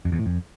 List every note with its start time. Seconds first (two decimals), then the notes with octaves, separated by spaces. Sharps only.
0.05 F2
0.12 E2
0.19 A2
0.26 F2